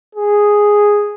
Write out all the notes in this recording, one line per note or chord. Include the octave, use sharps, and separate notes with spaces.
G#4